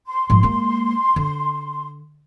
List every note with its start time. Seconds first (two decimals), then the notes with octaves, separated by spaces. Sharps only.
0.07 C6
0.30 G#2 F3
0.43 G#3 A#3
1.16 D3